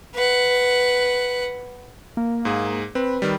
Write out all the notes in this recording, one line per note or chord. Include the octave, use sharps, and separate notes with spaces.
B4 F#5
A#3
G#2 G#4
C4 B4
D#3 G3